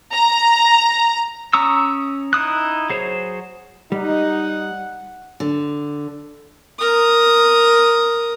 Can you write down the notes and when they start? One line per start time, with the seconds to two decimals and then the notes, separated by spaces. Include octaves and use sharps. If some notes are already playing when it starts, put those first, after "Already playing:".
0.13 A#5
1.53 C#4 A#5 C#6 D#6 E6
2.33 D#4 E4 D#6 F#6
2.90 F#3 G#4 C5 C#5
3.92 G3 D#4 F#5
5.40 D3
6.79 A#4 D#6